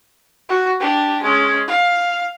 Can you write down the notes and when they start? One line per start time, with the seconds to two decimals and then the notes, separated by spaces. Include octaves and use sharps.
0.49 F#4
0.80 D4 G4
1.22 G#3 C#4
1.68 F5